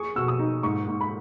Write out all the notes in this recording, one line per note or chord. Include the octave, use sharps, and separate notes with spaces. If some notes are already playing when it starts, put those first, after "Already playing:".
Already playing: G#4 C#6
B2 E6
D#6
D#4
G#2 C#6
G#2
B5